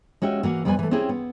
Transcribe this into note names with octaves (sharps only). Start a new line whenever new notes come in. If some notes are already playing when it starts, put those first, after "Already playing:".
G#3 C#4 F#4 G4 E5
E3 A#3 F#4
F2 G3 B3 G#4 B4 G#5
E3 A3
C4 C#4 E4 G4 G#4
B3